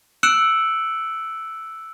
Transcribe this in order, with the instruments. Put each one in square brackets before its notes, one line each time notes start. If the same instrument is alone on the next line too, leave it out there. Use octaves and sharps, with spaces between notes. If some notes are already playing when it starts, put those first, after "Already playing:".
[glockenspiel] E6 F#6 C#7 D7 E7 F#7